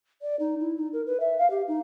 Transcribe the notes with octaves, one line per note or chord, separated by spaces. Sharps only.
D5
D#4
E4
D#4
A#4
B4
E5
F5
G4
D#4